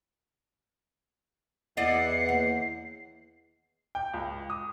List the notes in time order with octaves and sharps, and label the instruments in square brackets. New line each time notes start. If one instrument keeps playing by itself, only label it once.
[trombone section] E2 [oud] E4 D5 D#5 [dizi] F#5 [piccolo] C7
[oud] D#2
[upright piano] G5
C#2
D#6